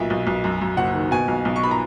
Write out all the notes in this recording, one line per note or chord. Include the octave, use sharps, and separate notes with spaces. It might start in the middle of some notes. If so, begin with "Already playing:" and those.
Already playing: B1 A#2 E5
B1
B1
F#2
F#2
F#1 F#5
D#3
B2 G#5
B1
B1
C#6
B5
A#5